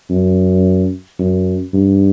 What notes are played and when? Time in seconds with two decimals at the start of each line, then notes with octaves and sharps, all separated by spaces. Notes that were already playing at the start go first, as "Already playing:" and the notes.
0.10 F#2
1.19 F#2
1.74 G2